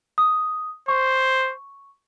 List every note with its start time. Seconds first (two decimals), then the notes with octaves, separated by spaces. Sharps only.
0.18 D#6
0.88 C5 C#6